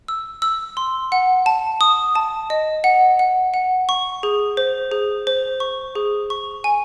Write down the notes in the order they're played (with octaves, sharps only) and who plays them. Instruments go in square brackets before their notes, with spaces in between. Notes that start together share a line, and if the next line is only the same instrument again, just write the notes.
[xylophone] E6
E6
C6
F#5
A5
D#6
A5
D#5
F#5
F#5
F#5
C#6
G#4
C5
G#4
C5
C#6
G#4
C#6
G#5